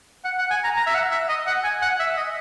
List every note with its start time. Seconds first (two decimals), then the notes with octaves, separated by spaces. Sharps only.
0.25 F#5
0.38 F#5
0.51 G#5
0.64 A#5
0.77 A#5
0.87 E5
0.95 F#5
1.11 E5
1.29 D#5
1.47 F#5
1.64 G#5
1.82 F#5
1.99 E5
2.17 D#5